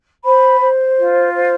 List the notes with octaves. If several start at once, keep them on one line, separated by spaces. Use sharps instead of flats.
C5 B5
C5
F4
C5